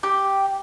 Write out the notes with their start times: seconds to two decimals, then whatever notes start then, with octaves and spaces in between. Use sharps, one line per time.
0.03 G4